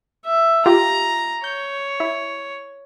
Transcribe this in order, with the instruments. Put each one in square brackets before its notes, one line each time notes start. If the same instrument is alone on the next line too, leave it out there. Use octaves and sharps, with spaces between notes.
[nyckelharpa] E5
[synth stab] F4 G4 [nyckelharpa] A#5
[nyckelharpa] C#5 [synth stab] G6
[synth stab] E4